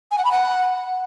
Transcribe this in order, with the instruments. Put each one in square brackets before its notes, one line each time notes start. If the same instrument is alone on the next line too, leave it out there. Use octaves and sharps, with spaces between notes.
[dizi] G#5
F#5
B5
F#5